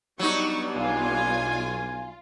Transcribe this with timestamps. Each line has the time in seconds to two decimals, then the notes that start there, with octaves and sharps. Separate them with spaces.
0.19 F#3 G3 B3 D4 D#4 C#6
0.75 B1 F4 G#5